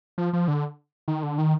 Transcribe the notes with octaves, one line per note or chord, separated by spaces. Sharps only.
F3
F3
D3
D#3
D3
D#3